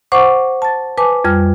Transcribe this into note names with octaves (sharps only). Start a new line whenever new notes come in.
C5 F#5 C#6 D6
A5 A6
B4 G#5 A5 D6
F2 G3 F6